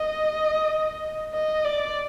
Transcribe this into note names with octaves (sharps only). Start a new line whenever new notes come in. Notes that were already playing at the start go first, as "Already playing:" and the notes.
Already playing: D#5
D#5
D5